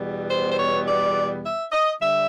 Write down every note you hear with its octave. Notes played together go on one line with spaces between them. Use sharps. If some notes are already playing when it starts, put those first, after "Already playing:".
Already playing: E2 B2 G3 B3
C5
C5
C#5
D5
E5
D#5
D3 G3 E5